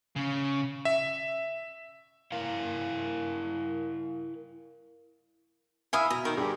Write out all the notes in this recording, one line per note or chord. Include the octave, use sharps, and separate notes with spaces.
C#3
E5
E4 A#4 F5
E4 E5 F5 G#5 D#6 E6
B2 A#5
D#3 A#4
G2 G4 G#4